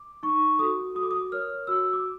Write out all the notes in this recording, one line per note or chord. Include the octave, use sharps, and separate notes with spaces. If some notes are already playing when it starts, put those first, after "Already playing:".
Already playing: D6
D#4 C#6
F#4 A4 D#6
F#4 D#6
D6
D#6
A#4 C#5 F6
F#4 E6
D6